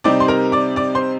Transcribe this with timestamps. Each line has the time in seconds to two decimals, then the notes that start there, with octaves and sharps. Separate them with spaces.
0.04 C3 G3 C4 D#4 D5 D6
0.20 C6
0.28 A#4 A#5
0.52 D5 D6
0.76 D5 D6
0.95 C5 C6